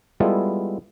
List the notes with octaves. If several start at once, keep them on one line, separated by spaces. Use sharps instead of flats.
G3 G#3 B3 E4 F4 A4